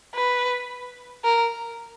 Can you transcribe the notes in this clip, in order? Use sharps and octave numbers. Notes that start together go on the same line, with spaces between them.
B4
A#4